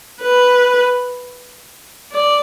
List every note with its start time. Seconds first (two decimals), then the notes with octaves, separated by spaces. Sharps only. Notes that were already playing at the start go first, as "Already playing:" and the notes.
0.22 B4
2.12 D5